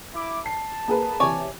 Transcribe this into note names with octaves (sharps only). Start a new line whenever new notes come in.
E4 D6
A5 C7
A#3 G#4 B4
C3 E3 C#5 D5 G#5